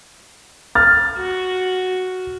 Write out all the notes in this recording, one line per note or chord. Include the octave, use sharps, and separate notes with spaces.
F6 A6
F#4